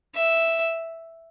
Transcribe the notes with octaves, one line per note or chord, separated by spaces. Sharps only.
E5